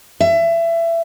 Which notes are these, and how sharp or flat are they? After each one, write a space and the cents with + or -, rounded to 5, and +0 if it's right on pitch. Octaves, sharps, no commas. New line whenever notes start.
E5 +25